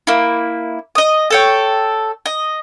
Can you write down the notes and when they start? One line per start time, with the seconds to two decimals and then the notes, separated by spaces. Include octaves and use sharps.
0.07 A#3 E4
0.95 D#5 D#6
1.30 A4 C#5 G5
2.26 D#5